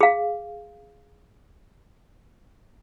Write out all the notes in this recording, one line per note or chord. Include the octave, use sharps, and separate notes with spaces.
G#4 F5